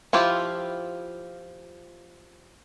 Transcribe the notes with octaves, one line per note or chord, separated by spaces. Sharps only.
F3 E4 F4 G4